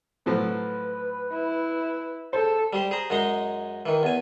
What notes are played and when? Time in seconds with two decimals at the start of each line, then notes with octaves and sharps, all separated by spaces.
0.26 A2 F3 F#3 B4
1.32 E4
2.33 G#2 A4 C5
2.73 G3 G4 C5
2.91 G#4 C5 A#5
3.10 F#2 G#3 D#4 A#5 C6
3.86 D#3 E3
4.03 E2 G#5